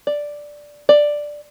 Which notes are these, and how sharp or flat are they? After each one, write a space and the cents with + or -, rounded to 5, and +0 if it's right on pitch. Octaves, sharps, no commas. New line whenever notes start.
D5 +0
D5 +5